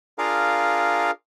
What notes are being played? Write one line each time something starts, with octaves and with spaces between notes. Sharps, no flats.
D4 F4 G#4 A#4 F5